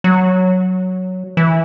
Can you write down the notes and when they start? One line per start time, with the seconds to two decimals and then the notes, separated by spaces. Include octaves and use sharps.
0.04 F#3
1.37 E3